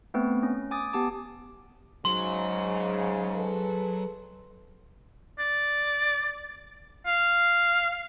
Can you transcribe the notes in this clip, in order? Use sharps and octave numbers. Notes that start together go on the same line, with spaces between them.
A3 B3 C4 B4
C#4
G#5 D6 D#6 A6
B3 G4 A5 D6
G#2 C#3 F#3 C6
G#4 A4 B4
D5
F5